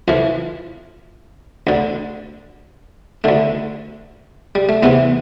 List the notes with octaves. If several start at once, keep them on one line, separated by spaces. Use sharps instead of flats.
F2 E3 F3
D2 D3
D2 D3 A3
G3
A3
E2 C3 E3 B3